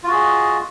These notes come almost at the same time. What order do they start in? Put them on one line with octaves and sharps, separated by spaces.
F4 F#4 G#4 D#5